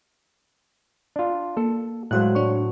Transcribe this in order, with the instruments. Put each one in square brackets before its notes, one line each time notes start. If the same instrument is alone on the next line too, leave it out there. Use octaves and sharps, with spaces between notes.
[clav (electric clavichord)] D4 F4
[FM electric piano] A#3 [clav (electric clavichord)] A4
[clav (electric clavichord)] A2 F#3 C5 [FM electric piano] G#3 F5 F#6
[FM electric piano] D4 C#5 C#6